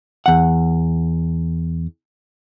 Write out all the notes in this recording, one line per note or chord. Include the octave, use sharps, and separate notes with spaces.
E2 F#5